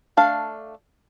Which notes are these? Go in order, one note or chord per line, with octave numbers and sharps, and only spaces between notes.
A3 D4 A4 D5 F5